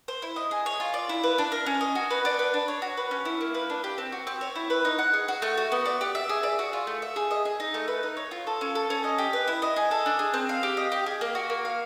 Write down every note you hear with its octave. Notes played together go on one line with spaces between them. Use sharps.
C5
E4
D#5
G#4
C#5
F4
D5
E4
B4
D4
A#4
C#4
D#5
F#4
B4
D4
B4
D4
C#5
F#4
B4
C#4
E4
A#3
B4
D4
G4
C4
F#4
C4
C#5
E4
B4
D#4
F#5
G#4
F#4
A3
F#4
B3
D5
G4
E5
G#4
D5
F#4
F4
A3
E5
G#4
D#5
G#4
D#4
A3
B4
D#4
C#5
F4
A4
C#4
A4
C#4
D#5
G4
B4
E4
D#5
G#4
A4
D4
G#4
C4
F5
G4
D#5
G4
G#4
A#3
F#4
A#3
F5